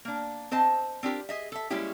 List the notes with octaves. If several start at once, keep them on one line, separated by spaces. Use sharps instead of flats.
A#3 D4
C4 C5 D#5 A5
C4 D4 F4 G4 A#4
G#4 D#5 E5
A4 E5
G3 G#3 A#3 C#4 E4 G4